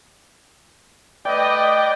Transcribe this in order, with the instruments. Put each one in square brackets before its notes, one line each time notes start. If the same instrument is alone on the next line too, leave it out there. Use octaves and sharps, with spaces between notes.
[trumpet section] A3 B4 D#5 [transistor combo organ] D5 G5